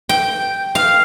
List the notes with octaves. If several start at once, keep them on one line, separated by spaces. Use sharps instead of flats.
G5
F5